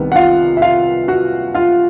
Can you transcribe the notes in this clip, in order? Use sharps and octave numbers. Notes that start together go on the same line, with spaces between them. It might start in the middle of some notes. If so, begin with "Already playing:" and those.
Already playing: C2 C3 D#3 B3
F#5
F4 F5
E5
F4 F5
F#4 F#5
F4 F5